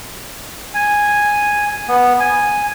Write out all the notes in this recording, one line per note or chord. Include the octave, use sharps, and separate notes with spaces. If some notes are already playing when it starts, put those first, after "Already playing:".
G#5
B3
G#5